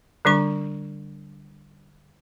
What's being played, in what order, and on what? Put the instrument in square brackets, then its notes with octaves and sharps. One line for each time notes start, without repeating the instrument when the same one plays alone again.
[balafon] D3 G3 D4 C#6